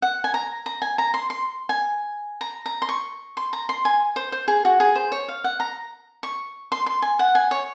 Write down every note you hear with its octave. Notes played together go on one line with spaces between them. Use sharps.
F#5
G#5
A#5
A#5
G#5
A#5
C6
C6
G#5
A#5
A#5
C6
C#6
C6
A#5
C6
G#5
C5
C5
G#4
F#4
G#4
C5
C#5
F5
F#5
A#5
C#6
C6
C6
G#5
F#5
G#5
C#5